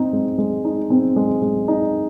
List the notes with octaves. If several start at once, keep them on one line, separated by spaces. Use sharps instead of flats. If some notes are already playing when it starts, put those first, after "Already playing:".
Already playing: C4 D#4
G#3
G#3
D#4
C4
G#3
G#3
D#4